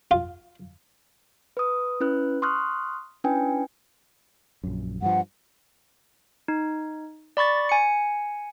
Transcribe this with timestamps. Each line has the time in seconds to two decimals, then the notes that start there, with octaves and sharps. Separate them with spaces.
0.11 F4
1.57 B4 D#6
2.00 C#4 E4 B4 F#6
2.42 C6 C#6 D#6 F6 F#6
3.24 C#4 D4 E4 B4 G5 G#5
4.64 A#1 F#2
5.02 G2 F3 F#5
6.48 D#4
7.37 D5 B5 C#6 A6
7.69 G#5 C#7